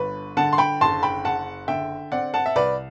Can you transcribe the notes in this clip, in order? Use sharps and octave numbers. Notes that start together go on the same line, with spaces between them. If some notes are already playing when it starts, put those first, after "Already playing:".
Already playing: G1 D3 B4
D3 F#5 A5
C6
G5 B5
F#1 A5 C6
G5 B5
F#1 F#5 A5
D3 E5 G5
C4 D5 F#5
F#5 A5
E5
C2 B4 D5